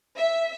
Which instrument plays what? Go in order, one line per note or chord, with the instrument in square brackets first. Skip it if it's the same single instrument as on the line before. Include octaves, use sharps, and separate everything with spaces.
[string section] E5